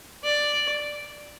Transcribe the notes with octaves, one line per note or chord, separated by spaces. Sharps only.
D5